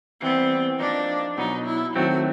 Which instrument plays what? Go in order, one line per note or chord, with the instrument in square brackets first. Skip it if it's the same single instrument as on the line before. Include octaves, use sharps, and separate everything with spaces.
[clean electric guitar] E3 G3 B3 [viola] C4
[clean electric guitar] F3 A#3 D#4 [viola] D4
[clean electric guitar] B2 F#3 B3 [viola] D#4
[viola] E4
[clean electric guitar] D#3 F#3 A3 C4 [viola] F#4